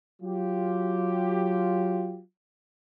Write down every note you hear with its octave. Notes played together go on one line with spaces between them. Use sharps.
F#3 F4 G4